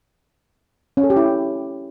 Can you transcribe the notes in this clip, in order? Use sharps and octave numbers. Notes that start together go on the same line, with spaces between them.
C#4
A4
G4
E4